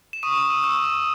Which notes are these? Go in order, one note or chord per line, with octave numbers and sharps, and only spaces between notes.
E7
C#6 D#6 D#7
E6
E6 E7
C#6